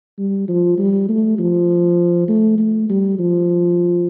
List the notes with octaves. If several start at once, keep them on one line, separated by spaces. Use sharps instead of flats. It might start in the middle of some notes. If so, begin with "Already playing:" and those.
G3
F3
G3
A3
F3
A3
A3
G3
F3